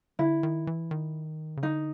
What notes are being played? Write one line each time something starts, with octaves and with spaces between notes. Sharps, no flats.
D3 E4
D#3
E3
D#3
C#3
D3 D#4